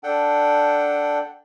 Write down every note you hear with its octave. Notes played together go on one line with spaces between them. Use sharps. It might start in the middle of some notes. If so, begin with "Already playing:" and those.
D4 A4 F#5 G5